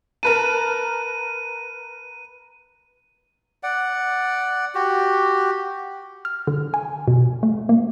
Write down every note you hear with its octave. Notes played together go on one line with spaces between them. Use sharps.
A#4 B4 A5 D#7
D5 F#5
F#4 G4
F6
D3
G#5
B2
A3
A#3